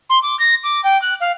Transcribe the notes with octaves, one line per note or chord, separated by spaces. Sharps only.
C6
D6
A#6
D6
G5
F#6
F5